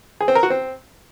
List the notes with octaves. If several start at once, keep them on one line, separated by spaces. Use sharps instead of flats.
G#4
C4
A#4
F#4
C4